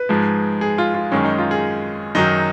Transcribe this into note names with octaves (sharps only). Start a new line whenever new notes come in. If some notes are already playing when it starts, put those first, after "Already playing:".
Already playing: B4
G#2 F3 G#3
G#4
F4
F4
F#2 D#3 G#3 C#4
D#4
F4
G#4
F#2 D#3 F#3 D#4